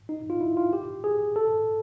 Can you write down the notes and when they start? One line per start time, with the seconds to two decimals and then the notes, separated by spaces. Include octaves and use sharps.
0.09 D#4
0.30 F4
0.41 E4
0.57 F4
0.73 G4
1.04 G#4
1.36 A4